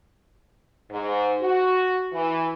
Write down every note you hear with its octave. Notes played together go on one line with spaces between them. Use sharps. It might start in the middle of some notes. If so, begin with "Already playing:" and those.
G#2
F#4
E3